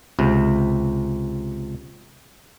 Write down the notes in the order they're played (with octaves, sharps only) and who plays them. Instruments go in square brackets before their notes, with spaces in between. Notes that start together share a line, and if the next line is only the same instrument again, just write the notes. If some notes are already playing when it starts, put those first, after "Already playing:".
[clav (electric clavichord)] C#2 C3